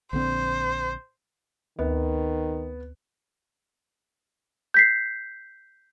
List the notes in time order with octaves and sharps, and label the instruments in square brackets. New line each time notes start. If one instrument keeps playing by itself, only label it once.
[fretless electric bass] A#1 D3 C4 [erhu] C5
[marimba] D2 [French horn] D#3 [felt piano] B3
[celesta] G6 B6 C7